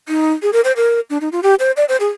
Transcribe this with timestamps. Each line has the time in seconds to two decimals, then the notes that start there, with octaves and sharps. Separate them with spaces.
0.09 D#4
0.42 G#4
0.53 A#4
0.64 C5
0.76 A#4
1.10 D4
1.21 D#4
1.32 F4
1.43 G4
1.60 C5
1.77 D5
1.89 C5
2.00 G#4